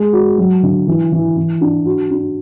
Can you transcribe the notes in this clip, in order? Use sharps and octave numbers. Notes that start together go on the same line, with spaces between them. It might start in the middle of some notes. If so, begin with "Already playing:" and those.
Already playing: G#3
F#4
F#3
D3
E3
E3
E3
D4
F#4
D4